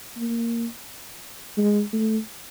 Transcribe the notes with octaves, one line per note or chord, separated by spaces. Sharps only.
A#3
G#3
A3